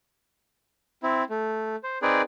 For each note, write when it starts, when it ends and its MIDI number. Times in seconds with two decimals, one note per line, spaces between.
1.03 1.24 60
1.03 1.24 64
1.30 1.76 57
1.83 1.99 72
2.02 2.22 60
2.02 2.22 63
2.02 2.22 68
2.02 2.22 71
2.02 2.22 74